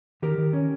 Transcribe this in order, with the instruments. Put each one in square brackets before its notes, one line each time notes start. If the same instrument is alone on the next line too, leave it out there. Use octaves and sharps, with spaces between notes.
[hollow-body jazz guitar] D#3 G4 A#4
D#3
C#4